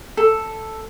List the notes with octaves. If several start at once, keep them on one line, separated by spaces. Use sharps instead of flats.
A4